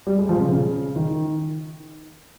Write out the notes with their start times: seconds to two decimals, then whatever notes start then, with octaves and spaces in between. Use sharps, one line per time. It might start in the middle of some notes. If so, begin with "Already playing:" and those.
0.07 G3
0.18 G#3
0.29 F3
0.40 C#3
0.51 C#3
0.96 D#3